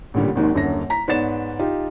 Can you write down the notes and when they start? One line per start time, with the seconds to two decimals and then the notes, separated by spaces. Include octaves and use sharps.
0.14 A1 A#2 D3 G3
0.35 G#1 D#2 G#2 D#3
0.55 D#1 F#2 D3 A#6
0.90 A#5 B6
1.08 G#2 B3 C#5 D5 A6 E7
1.59 D#4 F4 G4